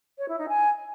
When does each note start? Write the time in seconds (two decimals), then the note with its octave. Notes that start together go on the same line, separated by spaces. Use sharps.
0.18 C#5
0.28 E4
0.38 D#4
0.48 G#5